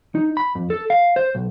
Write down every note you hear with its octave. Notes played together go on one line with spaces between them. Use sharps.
D#4
B5
F2
A4
F5
C5
B1